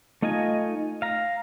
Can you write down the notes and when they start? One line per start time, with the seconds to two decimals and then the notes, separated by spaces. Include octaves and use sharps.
0.22 A3 D#4 F4 D#5 G#5
1.02 F5 A#5